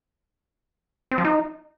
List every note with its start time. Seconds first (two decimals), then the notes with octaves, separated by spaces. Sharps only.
1.11 C4
1.18 F3
1.25 D#4